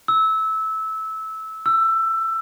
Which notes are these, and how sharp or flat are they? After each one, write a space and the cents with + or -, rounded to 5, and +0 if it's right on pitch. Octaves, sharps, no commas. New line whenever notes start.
E6 -20
E6 +20